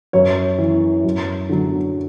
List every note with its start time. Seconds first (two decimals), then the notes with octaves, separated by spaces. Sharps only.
0.13 F#2 C#5
0.58 E3
1.04 F#2
1.49 D3 F#3